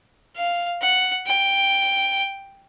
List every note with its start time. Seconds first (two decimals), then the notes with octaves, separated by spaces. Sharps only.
0.36 F5
0.81 F#5
1.26 G5